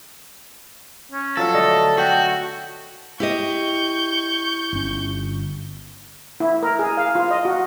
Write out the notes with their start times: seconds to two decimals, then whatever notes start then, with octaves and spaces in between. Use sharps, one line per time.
1.11 C#4
1.37 F3 F#3 F4 A4
1.54 D3 A3 D#5
1.98 F#4 E5 G5
3.20 E4 G4 D#5 C#6 G6
4.73 G1 C#4
6.40 E4
6.63 A#4
6.79 G#4
6.97 F5
7.15 F4
7.31 D#5
7.45 F#4